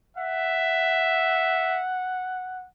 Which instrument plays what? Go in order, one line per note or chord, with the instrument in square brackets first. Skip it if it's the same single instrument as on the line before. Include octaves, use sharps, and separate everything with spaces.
[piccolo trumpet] E5 [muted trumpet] F#5